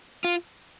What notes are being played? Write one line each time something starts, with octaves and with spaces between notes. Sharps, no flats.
F4